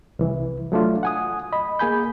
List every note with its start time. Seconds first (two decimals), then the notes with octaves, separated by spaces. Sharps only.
0.19 C2 E3
0.72 F#3 A3 D4 F4
1.03 F#5 G#5 D#6
1.52 D#5 B5
1.79 A#3 G#4 G#5 B5 G6